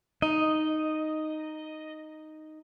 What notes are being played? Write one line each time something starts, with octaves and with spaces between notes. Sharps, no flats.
D#4 D#5